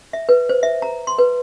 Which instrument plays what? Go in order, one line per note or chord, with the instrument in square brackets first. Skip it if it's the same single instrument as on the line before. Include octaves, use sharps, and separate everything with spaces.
[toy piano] E5
B4
C5
E5
A#5
C6
B4